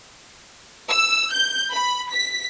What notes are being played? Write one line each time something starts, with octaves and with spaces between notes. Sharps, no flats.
E6
G6
B5
B6